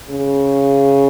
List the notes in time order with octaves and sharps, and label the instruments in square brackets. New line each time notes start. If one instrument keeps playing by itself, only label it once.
[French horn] C#3